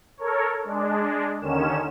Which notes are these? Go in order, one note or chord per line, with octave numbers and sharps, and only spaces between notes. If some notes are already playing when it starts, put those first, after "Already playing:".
A4 A#4 C#5
G#3 D4
D#2 D3 D#3 C#4 E7